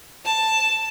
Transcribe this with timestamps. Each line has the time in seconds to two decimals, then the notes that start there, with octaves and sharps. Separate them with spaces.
0.25 A5